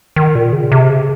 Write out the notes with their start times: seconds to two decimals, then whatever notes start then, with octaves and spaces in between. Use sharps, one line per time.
0.16 D#3
0.35 A#2
0.53 C#3
0.72 C3
0.90 C#3